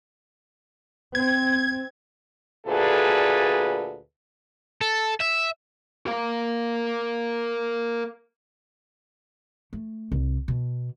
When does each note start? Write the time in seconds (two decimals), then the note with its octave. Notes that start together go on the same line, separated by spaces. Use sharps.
1.15 C4 G#6
2.67 D2 A#2 G#4 A4 B4
4.81 A4
5.21 E5
6.07 A#4 F5
9.73 A3
10.12 C2
10.48 B2